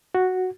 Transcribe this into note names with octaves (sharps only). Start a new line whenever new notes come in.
F#4